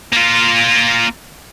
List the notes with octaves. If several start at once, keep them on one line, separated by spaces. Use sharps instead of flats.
A#3 F4